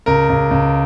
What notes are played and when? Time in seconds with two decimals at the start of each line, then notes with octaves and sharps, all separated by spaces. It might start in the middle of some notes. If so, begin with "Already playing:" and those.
0.06 C#2 A#4
0.29 C#2
0.51 C#2